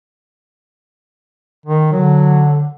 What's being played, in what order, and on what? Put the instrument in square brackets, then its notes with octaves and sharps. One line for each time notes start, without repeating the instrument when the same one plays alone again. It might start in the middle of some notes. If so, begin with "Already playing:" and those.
[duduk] D#3
[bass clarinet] D3 [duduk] F#3